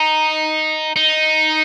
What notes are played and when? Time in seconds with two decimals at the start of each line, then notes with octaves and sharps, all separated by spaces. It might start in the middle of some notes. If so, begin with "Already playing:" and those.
Already playing: D#4
0.96 D#4